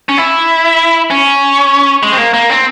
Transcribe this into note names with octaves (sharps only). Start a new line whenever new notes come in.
C#4
E4
C#4
G#3
C4
A#3
A#3
C4